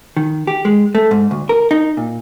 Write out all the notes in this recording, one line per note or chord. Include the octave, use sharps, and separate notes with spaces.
D#3
G4
G#3
A3
G#2
D2
A#4
D#4
A#2